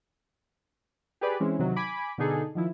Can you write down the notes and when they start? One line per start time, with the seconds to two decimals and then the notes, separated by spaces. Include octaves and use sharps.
1.21 G4 G#4 B4 D5
1.40 E3 G#3 C4 C#4 E4
1.59 C3 D#3 F#3
1.76 G#5 B5 D6
2.18 B2 D3 D4 D#4 G#4 A4
2.55 D#3 F3 E4